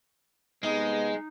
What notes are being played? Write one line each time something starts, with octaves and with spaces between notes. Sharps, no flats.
C3 G#3 B3 D#4 D#5